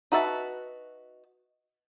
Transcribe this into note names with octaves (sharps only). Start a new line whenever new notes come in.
D#4 F#4 B4 E5 A5